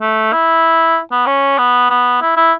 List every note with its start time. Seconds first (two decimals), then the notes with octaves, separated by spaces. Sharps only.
0.01 A3
0.33 E4
1.11 B3
1.26 C#4
1.58 B3
1.90 B3
2.22 E4
2.37 E4